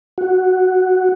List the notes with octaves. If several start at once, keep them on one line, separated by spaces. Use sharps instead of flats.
F#4